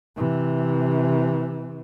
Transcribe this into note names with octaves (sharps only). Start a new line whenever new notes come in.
C3 E3